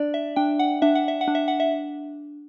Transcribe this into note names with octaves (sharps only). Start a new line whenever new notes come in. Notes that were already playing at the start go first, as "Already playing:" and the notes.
Already playing: D4 D5
E5
D4 G5
F#5
D4 E5
F#5
E5
F#5
D4
E5
F#5
E5